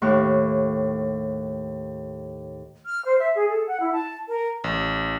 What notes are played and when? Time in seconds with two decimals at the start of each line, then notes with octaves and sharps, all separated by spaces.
0.02 D#2 A2 C#6 F#6
2.86 F6
3.05 C5
3.18 E5
3.35 G#4
3.48 A4
3.67 F#5
3.80 E4
3.93 A5
4.29 A#4
4.64 A1